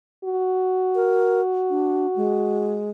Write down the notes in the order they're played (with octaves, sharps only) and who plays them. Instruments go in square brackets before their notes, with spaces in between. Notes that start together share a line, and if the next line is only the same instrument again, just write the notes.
[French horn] F#4
[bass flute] A#4
D4
G#3